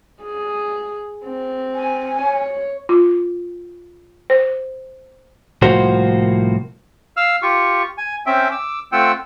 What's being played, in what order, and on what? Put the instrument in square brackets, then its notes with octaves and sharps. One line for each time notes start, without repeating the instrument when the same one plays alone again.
[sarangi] G#4
C4
[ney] G#5
[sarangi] C#5
[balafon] F4
C5
[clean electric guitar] C2 A2 F3 A#3 F#4 C5
[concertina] F5 E6 F6
F4 G4 C#6
G#5
C4 C#4 E5 G5
D6 E6
A3 C4 F4 F#5 G5 E6